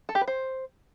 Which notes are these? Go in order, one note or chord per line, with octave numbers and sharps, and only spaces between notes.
A4
G4
B4
C5